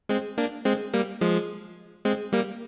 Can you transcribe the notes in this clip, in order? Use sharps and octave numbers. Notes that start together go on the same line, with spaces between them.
G#3 C4
A#3 D4
G#3 C4
G3 A#3
F3 G#3
G#3 C4
G3 A#3